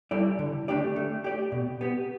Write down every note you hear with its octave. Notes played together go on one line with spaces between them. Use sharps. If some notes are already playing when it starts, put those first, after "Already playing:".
G3 E4 A4 D5
D3
A3 D4 G4 D5
A3
G4 D5
B2
B3 G4